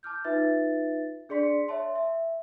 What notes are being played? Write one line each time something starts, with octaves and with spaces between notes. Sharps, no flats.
A5 D6 F6 G6
D#4 F4 B4 E5 A6
D4 G#4 D5 C6 B6 C#7
C#5 E5 A5 C6
E5